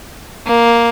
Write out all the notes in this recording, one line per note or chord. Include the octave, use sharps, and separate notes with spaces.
A#3